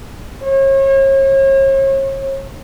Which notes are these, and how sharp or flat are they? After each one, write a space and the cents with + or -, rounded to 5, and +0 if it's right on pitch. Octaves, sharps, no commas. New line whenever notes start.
C#5 -40